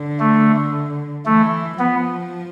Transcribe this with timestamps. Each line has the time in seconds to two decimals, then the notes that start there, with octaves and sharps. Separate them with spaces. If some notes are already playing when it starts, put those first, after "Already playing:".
Already playing: D3
0.20 A3
1.26 E3 A3
1.79 F3 B3